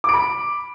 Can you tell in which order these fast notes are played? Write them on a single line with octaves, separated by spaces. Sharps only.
D6 D7 B5